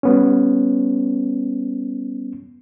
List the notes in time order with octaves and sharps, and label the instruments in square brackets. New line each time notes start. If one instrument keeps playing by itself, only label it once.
[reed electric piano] G3 B3 C#4